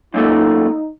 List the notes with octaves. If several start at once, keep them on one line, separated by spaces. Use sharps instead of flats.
F#2 A#2 A3 D#4